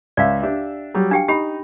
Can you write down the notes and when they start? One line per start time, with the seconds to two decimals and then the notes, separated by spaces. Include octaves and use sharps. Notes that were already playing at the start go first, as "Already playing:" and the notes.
0.17 C#2 D5 E5 F5
0.42 D4 G4 E5
0.95 F#3 G3 G4
1.11 D4 G4 F5 G5
1.28 D#4 G4 B5